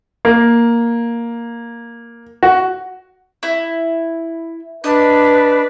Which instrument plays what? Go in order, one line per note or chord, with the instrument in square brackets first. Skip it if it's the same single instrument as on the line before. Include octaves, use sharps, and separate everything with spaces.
[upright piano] A#3
F#4
[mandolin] E4
[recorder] D4 [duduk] B4 [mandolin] D#5